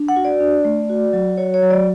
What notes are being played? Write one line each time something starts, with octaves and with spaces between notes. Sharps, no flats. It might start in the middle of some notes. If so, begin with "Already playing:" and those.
Already playing: D4
F#5
F#4
D5
D4
A3
F#4
F#3
F#4 C#5
C#5
F#3
D5